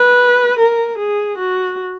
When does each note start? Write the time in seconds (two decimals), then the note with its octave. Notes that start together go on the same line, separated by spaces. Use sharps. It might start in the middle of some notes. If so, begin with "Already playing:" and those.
Already playing: B4
0.58 A#4
0.98 G#4
1.38 F#4